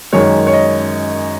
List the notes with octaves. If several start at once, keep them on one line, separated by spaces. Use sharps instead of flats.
F#2 D#3 G#3 C#5
C#5
D#5